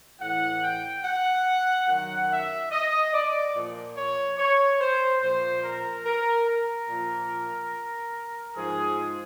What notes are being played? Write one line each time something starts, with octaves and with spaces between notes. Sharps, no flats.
A2 E3 F#5
G5
F#5
F#2 D#3 F#3 F#5
E5
D#5
D5
A#2 F3
C#5
C#5
C5
A#2 F3 C5
A#4
A#4
A#4
A#2 F3
G#2 F3 G#4